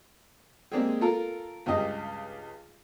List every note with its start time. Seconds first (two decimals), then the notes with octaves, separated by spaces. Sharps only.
0.72 G#3 A#3 C4 D4 G4 G#4
1.01 F4 A4 A#4
1.66 C#2 G2 G4 D#5